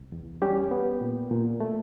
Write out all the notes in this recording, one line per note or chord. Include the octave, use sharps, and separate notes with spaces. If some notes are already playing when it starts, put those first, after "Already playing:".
Already playing: C2
E2
G3 C#4 G4
B3
A#2
A#2
A3